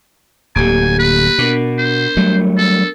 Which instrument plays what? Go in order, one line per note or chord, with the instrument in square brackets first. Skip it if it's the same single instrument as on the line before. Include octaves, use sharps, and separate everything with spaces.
[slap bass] D1 D3 [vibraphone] A#3 G4 [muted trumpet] G#5
[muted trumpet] B4
[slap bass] B2 [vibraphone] B3 D4 A#4
[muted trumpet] C5
[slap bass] F#3 G3 A3
[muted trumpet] A4